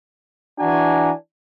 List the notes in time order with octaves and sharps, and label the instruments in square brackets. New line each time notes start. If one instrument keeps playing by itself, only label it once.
[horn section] E3 D4 F#4 G#5 A#5